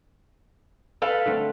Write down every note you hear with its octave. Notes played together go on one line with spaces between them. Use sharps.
A4 B4 F5
D3 A3 C4